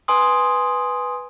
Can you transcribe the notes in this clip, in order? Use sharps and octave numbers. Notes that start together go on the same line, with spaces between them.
B4 G#5 C6 D#6